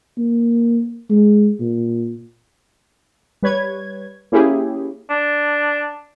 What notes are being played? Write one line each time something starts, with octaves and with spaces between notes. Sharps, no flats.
A#3
G#3
A#2
G3 B4 C#5 G#6
A#3 C#4 E4 G4 G#4
D4